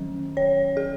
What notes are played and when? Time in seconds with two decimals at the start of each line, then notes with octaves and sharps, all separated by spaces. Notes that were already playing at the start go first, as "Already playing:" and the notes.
Already playing: D#3 F#3 C#4
0.37 C#5
0.77 G#4